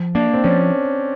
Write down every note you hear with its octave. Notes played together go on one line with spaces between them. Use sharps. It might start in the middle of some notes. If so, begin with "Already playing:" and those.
Already playing: F3
A#3 D4
C4
F3 C#4